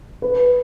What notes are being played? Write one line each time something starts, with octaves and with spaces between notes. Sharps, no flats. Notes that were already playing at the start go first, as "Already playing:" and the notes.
B4